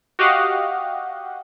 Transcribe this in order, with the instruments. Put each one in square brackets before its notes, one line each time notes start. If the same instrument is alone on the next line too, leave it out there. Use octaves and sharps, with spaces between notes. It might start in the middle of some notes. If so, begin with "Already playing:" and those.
[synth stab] F#4 G4 D#5 F5 F#5